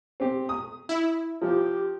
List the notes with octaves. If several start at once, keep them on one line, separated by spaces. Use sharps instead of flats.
C4 G4
D#6
E4
F3 G4